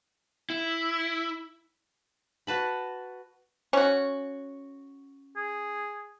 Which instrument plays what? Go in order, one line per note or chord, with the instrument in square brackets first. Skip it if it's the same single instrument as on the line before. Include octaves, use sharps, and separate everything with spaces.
[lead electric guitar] E4
[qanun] F#4 B4 A5 B5
[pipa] C#4 F#4
[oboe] G#4